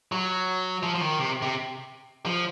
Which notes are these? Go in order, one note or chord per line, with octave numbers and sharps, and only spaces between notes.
F#3
F3
F3
D#3
C3
C3
F3